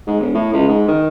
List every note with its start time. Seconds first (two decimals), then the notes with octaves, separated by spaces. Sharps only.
0.07 G#2
0.20 E1
0.34 A2
0.53 C#2
0.68 G#2
0.88 D#3